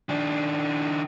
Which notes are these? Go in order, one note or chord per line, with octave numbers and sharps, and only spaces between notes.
D#3 D4